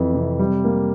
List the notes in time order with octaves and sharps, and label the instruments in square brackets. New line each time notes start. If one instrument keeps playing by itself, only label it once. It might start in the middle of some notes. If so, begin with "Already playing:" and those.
Already playing: [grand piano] F2 E3
C3
G3
A#3